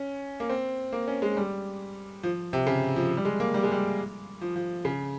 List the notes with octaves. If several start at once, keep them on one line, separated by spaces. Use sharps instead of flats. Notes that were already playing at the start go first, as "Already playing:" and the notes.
Already playing: C#4
A#3
C4
A#3
C#4
G#3
G3
F3
C3
C#3
F3
G3
G#3
A#3
G3
G#3
G3
F3
F3
C#3